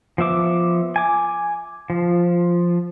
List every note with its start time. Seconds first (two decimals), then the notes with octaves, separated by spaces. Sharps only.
0.18 F3 B3 E5 D6
0.96 G#5 D6
1.90 F3